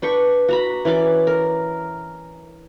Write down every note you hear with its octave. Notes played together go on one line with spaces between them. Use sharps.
D4 B4 G5 C#6
F#4 A#5 B5
E3 C#4 D5 D6
A#4